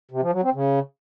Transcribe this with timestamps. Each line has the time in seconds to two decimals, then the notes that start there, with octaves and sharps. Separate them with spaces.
0.11 C3
0.22 F3
0.33 F#3
0.43 C4
0.54 C#3